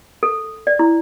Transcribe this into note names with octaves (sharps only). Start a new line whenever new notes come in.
A4
D5
E4